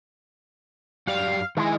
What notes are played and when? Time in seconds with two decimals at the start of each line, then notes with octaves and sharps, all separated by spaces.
1.07 F#2 G4 D5 F5
1.57 D#3 G#3 E4